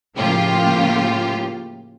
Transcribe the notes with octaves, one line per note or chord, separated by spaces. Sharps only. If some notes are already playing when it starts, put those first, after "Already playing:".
A2 C#3 F3 A#3 F4 G4